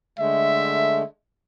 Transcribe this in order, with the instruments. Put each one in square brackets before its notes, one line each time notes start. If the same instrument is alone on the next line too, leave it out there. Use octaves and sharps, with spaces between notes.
[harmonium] D3 G#3 A3 [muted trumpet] E5